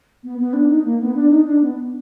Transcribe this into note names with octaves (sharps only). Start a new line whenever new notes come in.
B3
B3
D4
D#4
A#3
B3
D4
D#4
D4
B3